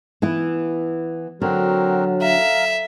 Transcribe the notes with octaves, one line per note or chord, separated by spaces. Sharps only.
E3 B3 E4
D3 F#3 C4 F#4 A#4
E5 F5 A#5